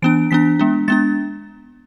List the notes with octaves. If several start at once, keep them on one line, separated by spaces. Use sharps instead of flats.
E3 B3 D4 D7
E3 B3 D4 B6
G#3 B3 D4
G#3 B3 D4 A6